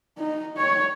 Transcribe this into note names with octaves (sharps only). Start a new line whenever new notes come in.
D#4
C#5